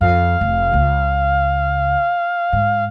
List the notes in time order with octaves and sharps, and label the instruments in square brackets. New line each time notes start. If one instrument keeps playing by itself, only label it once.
[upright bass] F2 [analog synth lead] F5
[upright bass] F1
C#2 C#3
G#2